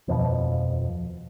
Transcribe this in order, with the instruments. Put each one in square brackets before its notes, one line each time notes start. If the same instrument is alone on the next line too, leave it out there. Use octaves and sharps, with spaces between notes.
[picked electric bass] D#1 F2 B2 F3